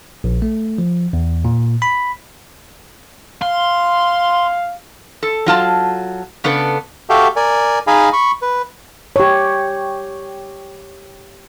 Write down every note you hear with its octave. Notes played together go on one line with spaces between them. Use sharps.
A#1
A3
F3
E2
A#2
B5
F5 C6
A4
F#3 F4 A5
C#3 B3 D4 A4 B4
F#4 G4 A4 E5 F5 G5
A#4 D5 G#5
D#4 G#4 D#5 F5 G#5 B5
B5 C#6
B4
G4 C#5